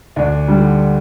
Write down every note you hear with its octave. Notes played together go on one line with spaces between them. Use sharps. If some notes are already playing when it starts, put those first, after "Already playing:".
D2 D4
D3 G3